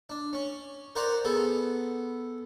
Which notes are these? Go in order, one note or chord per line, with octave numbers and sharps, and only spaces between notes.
D4
C#4
A#4 C5 D5 F#5 A#5
B3 G#4 A4